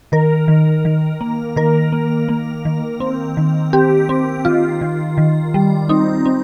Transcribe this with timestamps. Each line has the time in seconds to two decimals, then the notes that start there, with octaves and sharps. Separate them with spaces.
0.12 D#3 A#4
0.48 D#3
0.85 D#3
1.21 A#3
1.56 D#3 A#4
1.92 A#3
2.29 A#3
2.65 D#3
3.00 C4
3.37 D#3
3.73 C4 G4
4.09 C4
4.45 D#3 F4
4.81 D#3
5.18 D#3
5.54 G3
5.89 C4 D#4
6.26 C4